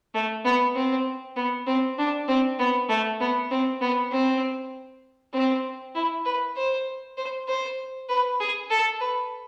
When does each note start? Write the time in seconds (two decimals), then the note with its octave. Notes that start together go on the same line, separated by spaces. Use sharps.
0.14 A3
0.45 B3
0.75 C4
1.36 B3
1.67 C4
1.98 D4
2.28 C4
2.59 B3
2.89 A3
3.20 B3
3.51 C4
3.81 B3
4.12 C4
5.34 C4
5.95 E4
6.26 B4
6.57 C5
7.17 C5
7.48 C5
8.09 B4
8.40 G#4
8.71 A4
9.01 B4